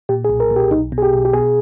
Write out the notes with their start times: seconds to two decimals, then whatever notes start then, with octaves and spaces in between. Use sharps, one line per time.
0.09 A#2 G4
0.24 G#4
0.29 B1
0.40 A#4
0.51 A#2
0.56 G4
0.71 B1 D#4
0.92 B2
0.98 G#4
1.02 G4
1.13 B1
1.25 G4
1.33 B2 G#4